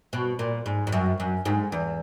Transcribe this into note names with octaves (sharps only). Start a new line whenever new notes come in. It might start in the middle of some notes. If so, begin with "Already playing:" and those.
B2
A#2
G#2
G#2
F#2
F#2
G#2
E2